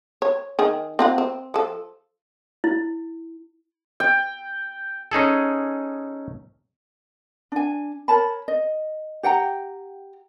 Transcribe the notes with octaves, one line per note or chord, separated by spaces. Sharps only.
C#5
D#3 G#4
C4 F4 F#5
C4
F3 A4
E4
G5
C#4 D#4 G#4 A4
D4 G#5
A#4 C#5 A5 B5
D#5
G4 F#5 G5 A#5